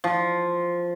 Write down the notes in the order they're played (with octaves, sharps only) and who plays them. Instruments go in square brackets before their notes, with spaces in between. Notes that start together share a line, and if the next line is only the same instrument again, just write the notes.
[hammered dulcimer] F3